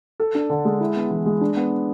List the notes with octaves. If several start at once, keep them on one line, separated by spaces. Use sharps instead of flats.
A4
D4
D3
G#3
E4
B3
E3
G#3
D4
B3